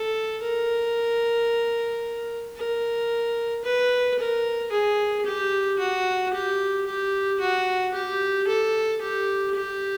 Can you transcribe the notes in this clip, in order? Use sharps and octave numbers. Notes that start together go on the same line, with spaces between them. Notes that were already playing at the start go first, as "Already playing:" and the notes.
Already playing: A4
A#4
A#4
B4
A#4
G#4
G4
F#4
G4
G4
F#4
G4
A4
G4
G4